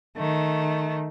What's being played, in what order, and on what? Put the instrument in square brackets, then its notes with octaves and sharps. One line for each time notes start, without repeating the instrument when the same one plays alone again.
[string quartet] D#3 A3